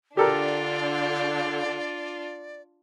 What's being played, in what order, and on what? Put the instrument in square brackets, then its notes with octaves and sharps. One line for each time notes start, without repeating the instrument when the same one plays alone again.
[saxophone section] D3 [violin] D4 F4 [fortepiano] G4 A4 A#4 [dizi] D5